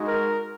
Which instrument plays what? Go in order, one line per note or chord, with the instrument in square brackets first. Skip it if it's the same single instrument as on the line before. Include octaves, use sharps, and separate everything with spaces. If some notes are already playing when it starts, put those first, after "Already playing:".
Already playing: [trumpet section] G#3 D#4 F#4
A#4